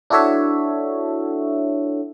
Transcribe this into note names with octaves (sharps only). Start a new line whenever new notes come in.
D4 E4 F#4 A4 C#5 E5